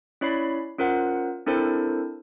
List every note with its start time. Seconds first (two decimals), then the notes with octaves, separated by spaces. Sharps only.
0.21 C#4 E4 C#5 D5 B5 C7
0.79 C#4 F4 A#4 C5 F#5
1.46 C4 D4 E4 A4 A#4 C5